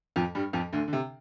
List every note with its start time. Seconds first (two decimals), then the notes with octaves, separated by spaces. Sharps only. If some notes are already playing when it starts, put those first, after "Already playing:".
0.16 F2 F3
0.35 G2 G3
0.53 F2 F3
0.73 D2 D3
0.88 D3
0.93 C3